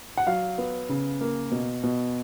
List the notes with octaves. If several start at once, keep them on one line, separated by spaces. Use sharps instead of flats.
F#5
F#3 F5
B3
C#3
A#3
B2
B2